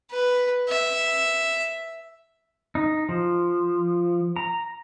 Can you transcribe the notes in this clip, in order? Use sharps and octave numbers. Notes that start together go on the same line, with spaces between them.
B4
E5
D#4
F3
A#5